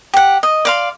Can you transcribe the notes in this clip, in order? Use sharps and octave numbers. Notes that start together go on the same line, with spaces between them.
G4 F#5
D#5
D5 F5 C6